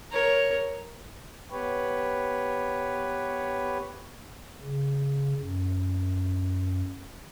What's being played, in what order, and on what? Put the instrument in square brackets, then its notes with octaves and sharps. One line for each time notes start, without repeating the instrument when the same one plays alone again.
[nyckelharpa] A#4 C#5
[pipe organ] B3 G4 B4 C#5
C#3
F#2